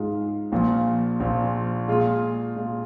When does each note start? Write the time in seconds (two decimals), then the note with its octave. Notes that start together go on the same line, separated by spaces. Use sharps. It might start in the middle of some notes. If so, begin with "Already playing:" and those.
Already playing: G#2 G#3 F4
0.52 A#1 A#2 F3
1.20 A#1 A#2 F3
1.88 A#2 G#3 F4 G#4
2.56 A#2 G#3 F4 G#4